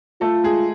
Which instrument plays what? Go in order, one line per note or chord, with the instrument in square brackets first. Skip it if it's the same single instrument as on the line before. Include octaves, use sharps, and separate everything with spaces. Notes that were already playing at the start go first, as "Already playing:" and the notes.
[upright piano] A3 A4 [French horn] F4
[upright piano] G#3 G#4